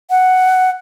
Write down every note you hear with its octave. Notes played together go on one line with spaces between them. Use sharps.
F#5